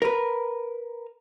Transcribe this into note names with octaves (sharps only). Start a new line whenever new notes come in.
A#4 B4